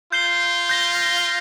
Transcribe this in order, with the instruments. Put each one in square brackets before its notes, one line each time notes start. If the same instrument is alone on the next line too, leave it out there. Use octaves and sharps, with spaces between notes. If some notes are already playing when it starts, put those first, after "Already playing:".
[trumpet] F4 [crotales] G6 C7 G7
[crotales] G6 A#6 G7